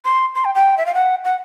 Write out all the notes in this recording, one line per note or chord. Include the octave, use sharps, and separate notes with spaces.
C6
C6
G5
G5
E5
F5
F#5
F#5